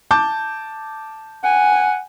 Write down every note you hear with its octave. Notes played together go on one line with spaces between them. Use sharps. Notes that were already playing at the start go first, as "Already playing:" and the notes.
A5 D6 G6
F#5 G#5